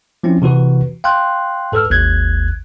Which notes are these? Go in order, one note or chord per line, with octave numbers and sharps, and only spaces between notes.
F3 C4 C#4 E4
C3 E3 F#4 B4
F5 G5 C6 F#6
G#2 A4 B4 E6 F6
G#1 D#2 F#6 G#6